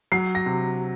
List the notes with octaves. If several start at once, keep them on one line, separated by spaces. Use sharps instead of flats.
F#3 C7
A#6
C3